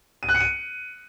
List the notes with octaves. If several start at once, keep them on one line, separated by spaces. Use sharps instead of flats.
D#7
F#6
C#7
D#7